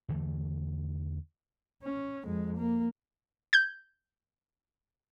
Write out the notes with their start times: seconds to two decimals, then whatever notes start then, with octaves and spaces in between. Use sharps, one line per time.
0.09 E2 D3 E3 A3
1.83 C#4
2.25 F2 G#3
2.57 A#3
3.53 G6 G#6